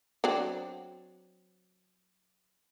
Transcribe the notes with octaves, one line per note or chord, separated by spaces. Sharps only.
F#3 C4 D4